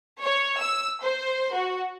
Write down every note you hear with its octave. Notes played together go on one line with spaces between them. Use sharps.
C#5
E6
C5
F#4